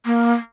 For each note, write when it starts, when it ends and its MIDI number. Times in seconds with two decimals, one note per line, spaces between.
0.06 0.33 58